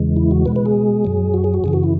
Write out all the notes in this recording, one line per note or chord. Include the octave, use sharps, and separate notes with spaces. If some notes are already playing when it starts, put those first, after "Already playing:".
Already playing: E2 C#3 E3 G#3
E4
F#4
B2 G#3 B4
B4
G#4
F#2 F#3
F#4
G#4
F#4
F#2 C#3 E3 G#4
F#4
E4